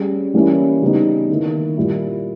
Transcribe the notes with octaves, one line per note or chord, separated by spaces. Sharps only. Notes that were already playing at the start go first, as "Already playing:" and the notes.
Already playing: G3 C#4 G#4
E3 G3 A#3 C#4 E4
C#3 G3 B3 D#4
D#3 A#3 E4
A#2 G3 A#3 E4